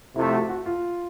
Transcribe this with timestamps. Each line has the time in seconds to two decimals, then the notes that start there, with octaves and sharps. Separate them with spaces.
0.16 F2 C3 F3 A3 E4
0.33 F#4
0.49 F#4
0.66 F4